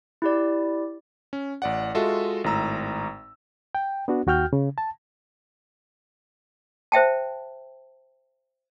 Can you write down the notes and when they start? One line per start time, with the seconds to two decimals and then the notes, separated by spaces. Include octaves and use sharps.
0.22 E4 G4 D5
1.33 C#4
1.62 A1 D5 F#5
1.94 G#3 F4 F#4 A4 D#5 E5
2.44 G#1 A2 A#5 E6
3.75 G5
4.08 B3 D4 F#4
4.27 D#2 F#4 G5 F6 G6
4.53 C#3
4.78 A5
6.92 C5 E5 G5 A5